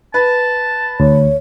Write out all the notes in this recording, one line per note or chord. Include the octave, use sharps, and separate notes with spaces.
B4 A5
D2 C#5